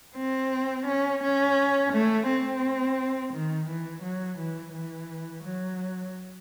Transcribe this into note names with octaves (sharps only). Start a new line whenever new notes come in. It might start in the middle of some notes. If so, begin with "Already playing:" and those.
C4
C#4
C#4
A3
C4
D#3
E3
F#3
E3
E3
F#3